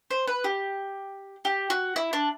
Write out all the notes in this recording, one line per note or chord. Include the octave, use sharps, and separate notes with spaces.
C5
B4
G4
G4
F#4
E4
D4